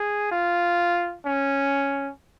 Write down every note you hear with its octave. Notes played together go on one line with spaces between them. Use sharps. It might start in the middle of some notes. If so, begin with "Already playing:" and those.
Already playing: G#4
F4
C#4